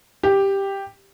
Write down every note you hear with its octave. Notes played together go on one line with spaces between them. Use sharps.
G4